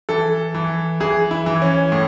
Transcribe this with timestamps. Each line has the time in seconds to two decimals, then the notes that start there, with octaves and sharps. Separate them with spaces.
0.09 E3 A4
0.55 E3
1.00 E3 G#4
1.31 E4
1.46 E3
1.62 C#4
1.92 A2